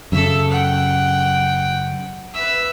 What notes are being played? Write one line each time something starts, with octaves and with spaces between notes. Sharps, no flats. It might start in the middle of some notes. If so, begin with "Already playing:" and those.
F#2 C#3 A4 E5
F#5 G5
B4 E5